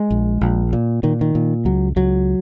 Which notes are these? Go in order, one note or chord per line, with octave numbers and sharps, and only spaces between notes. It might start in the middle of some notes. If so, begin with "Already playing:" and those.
Already playing: G#3
A#1
A#1
A#2
A#2 D#3
D#3
A#2
C#2 F#3
C#2 F#3